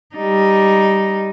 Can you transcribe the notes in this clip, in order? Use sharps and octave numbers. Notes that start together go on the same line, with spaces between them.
G3 D#4